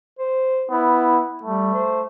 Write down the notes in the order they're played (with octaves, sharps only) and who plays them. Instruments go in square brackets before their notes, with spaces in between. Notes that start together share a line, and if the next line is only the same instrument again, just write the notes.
[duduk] C5
[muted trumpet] B3 [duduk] E4
[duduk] G3 [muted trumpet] A3
[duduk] C5